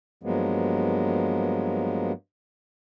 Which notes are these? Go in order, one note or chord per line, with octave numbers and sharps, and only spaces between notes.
G2 F3 F#3 G#3 A#3 B3